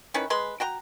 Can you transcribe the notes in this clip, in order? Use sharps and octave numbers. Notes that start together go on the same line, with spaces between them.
D#3 C#4 E4 B4
G#3 B4 C6
F#4 G5 A#5